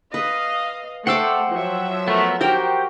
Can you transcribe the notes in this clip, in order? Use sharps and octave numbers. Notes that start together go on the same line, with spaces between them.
B4 D#5 F5
A3 C5 F#5 G5 C6 D6 E6
F3 F#3 E5
A3 B3 A#4
F#4 G4 A#4 C5 G5